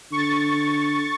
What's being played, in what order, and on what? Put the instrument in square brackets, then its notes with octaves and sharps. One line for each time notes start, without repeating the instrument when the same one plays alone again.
[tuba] D3 [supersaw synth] C#6 A6